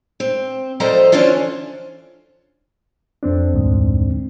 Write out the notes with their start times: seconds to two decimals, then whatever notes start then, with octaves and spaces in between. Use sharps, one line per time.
0.20 C4
0.80 F3 G3 A4 C5 D#5 A#5
1.12 D3 E3 C#4 D4 F4 C5
3.23 F2 C4 D4
3.54 D2 G#2